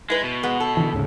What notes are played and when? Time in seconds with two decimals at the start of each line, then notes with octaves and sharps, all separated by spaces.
0.10 G#3 E4 B4
0.24 B2
0.43 G#3 B3
0.60 A4
0.77 D3 E3
0.93 D2 G#2 C#3